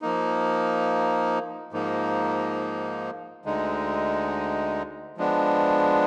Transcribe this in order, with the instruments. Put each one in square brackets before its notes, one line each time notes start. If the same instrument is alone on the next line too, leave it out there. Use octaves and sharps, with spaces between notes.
[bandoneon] F3 A#3 D#4
G#2 F3 A#3 D#4
D2 D3 G#3 D#4
F3 G#3 B3 D4